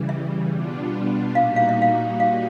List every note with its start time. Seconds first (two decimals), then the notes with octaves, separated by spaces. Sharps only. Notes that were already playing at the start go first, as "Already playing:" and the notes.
Already playing: C#3 E3 G3
0.09 E5
0.51 B2 G3 B3 D4 F4
1.35 A#2 G3 A#3 D#4 F#4 F5
1.56 F5
1.69 E5
1.82 F5
2.20 F5